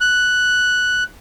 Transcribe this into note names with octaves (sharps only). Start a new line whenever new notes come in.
F#6